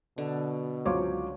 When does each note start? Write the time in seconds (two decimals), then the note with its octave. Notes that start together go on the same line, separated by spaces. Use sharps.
0.18 B2 D3
0.85 C#2 F#3 F4 C5 C#5 D6